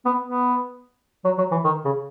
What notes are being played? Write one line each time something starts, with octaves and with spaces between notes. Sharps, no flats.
B3
B3
F#3
F#3
E3
D#3
C#3